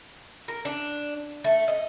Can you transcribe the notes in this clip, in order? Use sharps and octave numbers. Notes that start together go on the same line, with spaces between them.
A#4
D4
A3
D#5